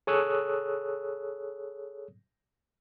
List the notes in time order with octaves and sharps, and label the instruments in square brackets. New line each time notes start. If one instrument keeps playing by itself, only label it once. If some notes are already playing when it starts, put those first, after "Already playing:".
[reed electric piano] G#4 A4 C#5 D#6 E6 F#6